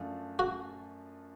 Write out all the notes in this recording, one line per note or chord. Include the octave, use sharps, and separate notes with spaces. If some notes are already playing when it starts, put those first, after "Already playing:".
Already playing: F#2 F3 A3 D4 F4
F#4